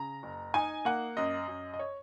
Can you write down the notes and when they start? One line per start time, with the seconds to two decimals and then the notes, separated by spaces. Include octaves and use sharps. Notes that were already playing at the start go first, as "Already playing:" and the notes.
Already playing: C#3 A#5
0.23 F#1
0.54 D#4 G#5
0.85 A#3 F#5
1.17 F#2 D#5
1.48 F#2
1.74 D#5
1.79 C#5